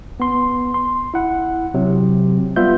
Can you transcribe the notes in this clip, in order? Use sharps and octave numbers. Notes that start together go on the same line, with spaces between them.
B3 C6
C6
E4 F#5
C3 F#3
G3 B3 F4 E5 G6